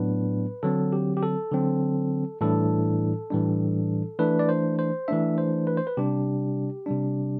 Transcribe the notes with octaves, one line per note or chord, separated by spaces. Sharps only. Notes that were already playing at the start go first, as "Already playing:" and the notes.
Already playing: A2 F#3 B3 D4 B4
D3 F#3 C4 A4
G4
G4
A4
D3 F#3 C4
A2 E3 G3 D4 A4
A2 E3 G3 D4
E3 A3 D4 B4
D5
C5
C5
E3 A3 D4 E5
C5
B4
C5
B4
C3 G3 D4 G4
C3 G3 D4